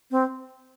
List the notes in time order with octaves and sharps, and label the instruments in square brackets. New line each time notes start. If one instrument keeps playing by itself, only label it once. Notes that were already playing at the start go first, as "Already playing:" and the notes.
[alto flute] C4